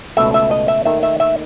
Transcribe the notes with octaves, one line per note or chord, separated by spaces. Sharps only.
C#2 B2 A3 E5
E5
D#5
E5
D#2 D#3 A3 E5
E5
E5